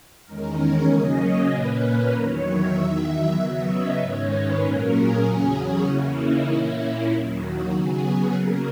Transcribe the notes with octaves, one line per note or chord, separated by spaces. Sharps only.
E2 D#3 G#3 C#4 A#4
C#5
C#3 F#3 A#3 C#4 D#5
C#5
A#2 A#3 C#4 B4
A#4
E2 D#3 F#3 C#5
E5
E2 D#3 F#3
E5
C#3 F#3 B3 E5
D#5
G#2 D#3 G#3 C#4 C#5
B4
A#2 F#3 A#3 C#4 A#4
G#4
E2 C#3 F#3 C#4
F#4
C#3 E3 A#3 C#4 E4
D#4
A#2 A#3 C#4 E4
D#2 D#3 F#3
F#4
C#3 F#3 B3 G#4
G#4
C#3 F#3 A#3 A#4